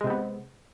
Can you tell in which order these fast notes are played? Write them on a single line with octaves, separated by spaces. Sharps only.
G#3 C3 C4 B3